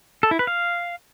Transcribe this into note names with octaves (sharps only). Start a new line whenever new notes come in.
A4
E4
B4
F5